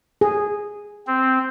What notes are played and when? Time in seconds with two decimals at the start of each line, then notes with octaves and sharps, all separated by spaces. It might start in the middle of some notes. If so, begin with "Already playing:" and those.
0.21 G#4
1.07 C4